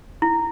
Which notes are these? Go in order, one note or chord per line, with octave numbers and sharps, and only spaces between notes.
E4